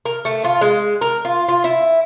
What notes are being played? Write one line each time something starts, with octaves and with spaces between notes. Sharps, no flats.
A#4
A3
F4
G#3
A#4
F4
F4
E4